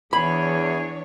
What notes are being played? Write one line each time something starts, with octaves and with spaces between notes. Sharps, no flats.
E2 E3 D4 G#4 C#5 B5